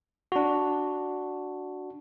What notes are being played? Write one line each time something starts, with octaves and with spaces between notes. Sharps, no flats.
D4 F#4